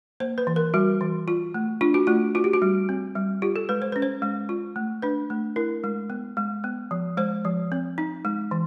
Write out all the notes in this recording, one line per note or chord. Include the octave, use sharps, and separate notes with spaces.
A#3 C5
B4
E3
A#4
G3 F#4
E3
F4
A3
D4 F4
F#4
A3 F4
F4 F#4
G4
F#4
G3
C4
G3
F4 G4
A4
G#3 B4
C5
C#4 B4
C5
G#3
F4
A3
D4 B4
A3
E4 A#4
G#3
B3
G#3
B3
F3
G#3 C5
F3
C4
D#4
G#3
E3